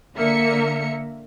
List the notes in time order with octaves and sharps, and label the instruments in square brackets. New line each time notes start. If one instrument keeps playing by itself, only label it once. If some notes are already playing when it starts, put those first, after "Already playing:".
[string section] D3 A#3 E5 A#5 C#7